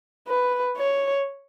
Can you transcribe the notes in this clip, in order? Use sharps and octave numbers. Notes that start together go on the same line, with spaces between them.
B4
C#5